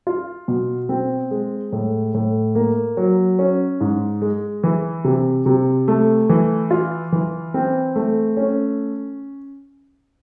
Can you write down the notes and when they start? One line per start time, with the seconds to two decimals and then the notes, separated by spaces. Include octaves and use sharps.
0.07 F4
0.48 B2
0.89 C4
1.31 G#3
1.72 A2
2.14 A2
2.55 A#3
2.97 F#3
3.39 C#4
3.81 G#2
4.22 G#3
4.63 E3
5.04 C3
5.46 C3
5.88 A3
6.29 E3
6.71 F4
7.12 E3
7.54 C4
7.96 A3
8.37 C#4